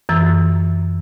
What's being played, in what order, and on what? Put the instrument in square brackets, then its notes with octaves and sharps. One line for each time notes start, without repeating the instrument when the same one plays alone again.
[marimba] F#2 E3 E6 A6